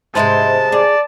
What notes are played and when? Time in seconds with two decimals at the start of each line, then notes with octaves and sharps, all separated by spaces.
0.15 G#2 C3 G#3 B4 C5 E5 A5
0.72 G#4 D5